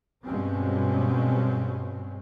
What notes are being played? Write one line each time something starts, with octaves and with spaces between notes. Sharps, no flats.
G2 B2 G#3 C4 C#4